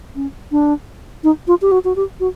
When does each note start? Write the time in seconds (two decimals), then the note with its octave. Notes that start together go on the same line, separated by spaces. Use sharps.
0.15 C#4
0.51 D4
1.24 D#4
1.47 F4
1.62 G4
1.71 F#4
1.84 F#4
1.96 G4
2.20 F#4